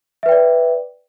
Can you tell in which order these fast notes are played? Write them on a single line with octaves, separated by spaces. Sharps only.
E5 B4 G5 D5